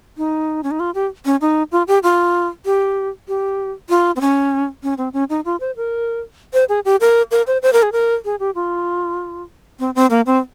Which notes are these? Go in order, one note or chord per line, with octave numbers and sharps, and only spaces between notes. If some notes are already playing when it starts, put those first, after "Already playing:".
D#4
C#4
D#4
F4
G4
C#4
D#4
F4
G4
F4
G4
G4
F4
C4
C#4
C#4
C4
C#4
D#4
F4
C5
A#4
C5
G#4
G4
A#4
A#4
C5
C5
A#4
G#4
A#4
G#4
G4
F4
C4
C4
A#3
C4